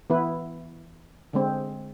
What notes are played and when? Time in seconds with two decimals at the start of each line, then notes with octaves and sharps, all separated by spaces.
0.10 E3 B3 E4 B4
1.33 D3 G#3 C4